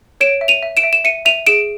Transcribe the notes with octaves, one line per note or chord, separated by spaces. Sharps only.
C#5 D7 E7
E5
D#7 F7
E5
D7 E7
E5
E7
E5 C#7 D#7
E5 D#7 F7
G#4 D7 E7